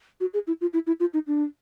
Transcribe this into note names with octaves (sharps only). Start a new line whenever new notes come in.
F#4
G#4
E4
F4
E4
E4
F4
D#4
D4